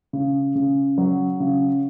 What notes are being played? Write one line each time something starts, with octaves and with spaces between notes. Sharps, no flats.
C#3
C#3
F#3
C#3